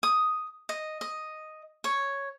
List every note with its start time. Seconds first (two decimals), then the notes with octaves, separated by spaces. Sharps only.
0.03 D#6
0.69 D#5
1.01 D#5
1.84 C#5